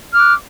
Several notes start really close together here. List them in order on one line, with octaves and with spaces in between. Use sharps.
F6 D6 F#6